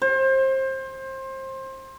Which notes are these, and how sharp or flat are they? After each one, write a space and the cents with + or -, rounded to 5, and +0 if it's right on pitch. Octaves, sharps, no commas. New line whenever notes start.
C5 +25